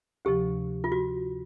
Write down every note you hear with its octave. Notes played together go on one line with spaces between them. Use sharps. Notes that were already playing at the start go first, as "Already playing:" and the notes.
D2 C3 F3 G4
F4
F#4